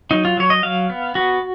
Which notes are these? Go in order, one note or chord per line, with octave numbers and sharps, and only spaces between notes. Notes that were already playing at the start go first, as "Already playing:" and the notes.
F#3 D#4
F4
F#3 C#5
D#5
F#3 F5
B3
B3 F#4